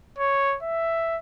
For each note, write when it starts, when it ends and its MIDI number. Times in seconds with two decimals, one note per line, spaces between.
0.18 0.57 73
0.63 1.18 76